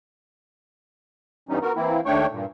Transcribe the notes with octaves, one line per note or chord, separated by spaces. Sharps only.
G2 E3 G3 B3 C#4 D#4
B3 F#4 A#4
E3 A#3 C4 E4
D#2 A3 D4 C#5 G5 C#6
G2 A#2